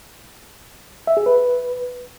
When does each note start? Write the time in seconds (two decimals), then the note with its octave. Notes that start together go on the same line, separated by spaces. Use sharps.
1.07 E5
1.17 G#4
1.26 B4